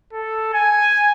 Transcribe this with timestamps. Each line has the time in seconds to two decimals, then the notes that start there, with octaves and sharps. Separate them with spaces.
0.13 A4
0.54 G#5